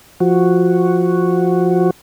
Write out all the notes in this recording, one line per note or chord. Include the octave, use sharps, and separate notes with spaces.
F3 F#4